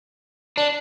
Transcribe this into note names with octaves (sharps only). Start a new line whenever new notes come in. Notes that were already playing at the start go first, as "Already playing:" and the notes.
D4